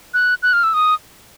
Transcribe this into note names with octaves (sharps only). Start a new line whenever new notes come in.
F#6
F#6
F6
E6
D#6